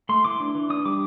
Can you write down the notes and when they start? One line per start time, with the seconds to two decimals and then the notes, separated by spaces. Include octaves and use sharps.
0.09 A3 C6
0.25 E3 D6
0.40 D4
0.55 E3
0.70 D4 D#6
0.85 G3 D6